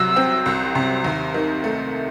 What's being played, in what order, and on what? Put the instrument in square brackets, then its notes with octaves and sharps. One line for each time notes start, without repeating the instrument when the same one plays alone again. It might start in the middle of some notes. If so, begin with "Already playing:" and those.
Already playing: [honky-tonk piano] C2 C3 F#3 [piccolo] E6
[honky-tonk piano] C4
C2
C3
D#2
D#3
A3